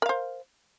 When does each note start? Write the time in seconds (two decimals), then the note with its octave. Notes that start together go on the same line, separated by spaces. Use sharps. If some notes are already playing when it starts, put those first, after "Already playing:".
0.02 A#4
0.06 F5
0.09 C5